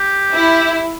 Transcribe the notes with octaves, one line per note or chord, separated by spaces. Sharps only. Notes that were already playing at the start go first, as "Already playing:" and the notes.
Already playing: G4
E4